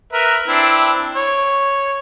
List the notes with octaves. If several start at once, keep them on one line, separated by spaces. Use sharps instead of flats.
A#4 B4 E5
C4 D4 E4
C#5